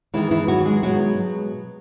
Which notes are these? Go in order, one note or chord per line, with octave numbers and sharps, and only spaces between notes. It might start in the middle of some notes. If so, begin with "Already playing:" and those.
D#3 E3 G#3 B3 E4
E3 E4
F#3 F#4
G#3 G#4
B2 F#3 G#3 B3 F#4